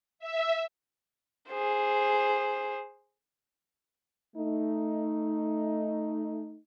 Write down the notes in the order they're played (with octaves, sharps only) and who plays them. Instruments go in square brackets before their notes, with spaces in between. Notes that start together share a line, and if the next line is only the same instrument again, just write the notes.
[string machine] E5
[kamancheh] G#4 C5
[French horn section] A3 D#4